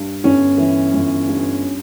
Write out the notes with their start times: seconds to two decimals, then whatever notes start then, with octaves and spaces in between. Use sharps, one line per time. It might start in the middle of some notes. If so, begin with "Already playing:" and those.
Already playing: G2
0.24 G1 C#4
0.58 E3
0.93 G1
1.28 G2